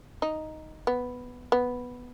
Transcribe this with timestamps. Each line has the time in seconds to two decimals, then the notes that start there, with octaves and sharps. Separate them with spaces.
0.22 D#4
0.87 B3
1.52 B3